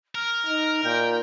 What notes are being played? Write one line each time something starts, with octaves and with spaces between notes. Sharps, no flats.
A#4 F6
D#4
A#2 G5